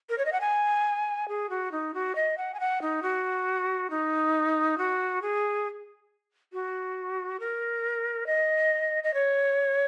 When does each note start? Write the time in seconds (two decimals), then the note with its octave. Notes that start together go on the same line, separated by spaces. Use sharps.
0.09 A#4
0.18 C#5
0.25 D#5
0.32 F#5
0.41 G#5
1.28 G#4
1.50 F#4
1.72 D#4
1.94 F#4
2.15 D#5
2.38 F#5
2.54 G#5
2.60 F#5
2.82 D#4
3.03 F#4
3.90 D#4
4.78 F#4
5.22 G#4
6.53 F#4
7.40 A#4
8.27 D#5
9.04 D#5
9.14 C#5